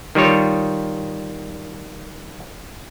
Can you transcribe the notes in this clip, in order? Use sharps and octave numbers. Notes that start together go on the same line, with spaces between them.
D#3 G3 F4 C#5